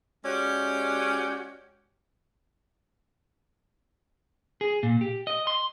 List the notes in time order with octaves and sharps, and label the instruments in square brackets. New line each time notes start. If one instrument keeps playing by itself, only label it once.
[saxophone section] G#3 C#4 F#4 G4 C#5 D5
[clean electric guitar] G#4
A#2
G4
D#5
C6